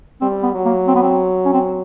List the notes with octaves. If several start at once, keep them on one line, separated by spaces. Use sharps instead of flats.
G3 C4
B3
F#3
A#3
C4
B3
C4
C#4
C4